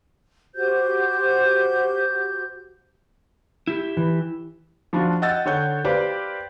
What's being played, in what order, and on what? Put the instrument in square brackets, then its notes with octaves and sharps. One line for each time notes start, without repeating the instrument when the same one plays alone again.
[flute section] F#4 G4 C5 G6
[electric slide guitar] E4 G4
[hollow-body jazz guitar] E3
[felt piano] F3 D4 F4 F#4
D#5 F#5 G5 E6 A6
D3 C#5 F#5 G6
G4 B4 C5 D5 F5 G5